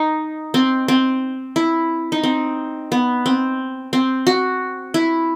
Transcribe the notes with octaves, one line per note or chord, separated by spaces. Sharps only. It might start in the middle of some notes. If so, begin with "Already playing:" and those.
Already playing: D#4
C4
C4
E4
D#4
C4
B3
C4
C4
F#4
E4